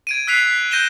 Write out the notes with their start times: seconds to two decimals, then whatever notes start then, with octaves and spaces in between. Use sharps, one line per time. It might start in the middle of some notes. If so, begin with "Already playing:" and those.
0.07 G#6 D7 D#7
0.27 E6 F#6 B6 C7 F7
0.47 B6
0.71 F#6 G6 A#6 D#7 E7 G7